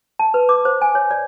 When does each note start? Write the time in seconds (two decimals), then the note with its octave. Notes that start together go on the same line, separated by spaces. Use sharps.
0.19 A5
0.34 B4
0.49 D6
0.65 C5
0.82 G#5
0.95 C#5
1.11 D5